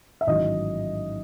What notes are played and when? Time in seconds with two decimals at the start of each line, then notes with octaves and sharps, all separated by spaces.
0.21 E5
0.27 A1 G#2 D#3 F#3 D#5